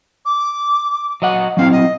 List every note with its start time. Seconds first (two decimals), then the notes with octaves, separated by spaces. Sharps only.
0.25 D6
1.22 F#3 D#5 F#5
1.57 F#3 C4 E4 F5
1.72 D#5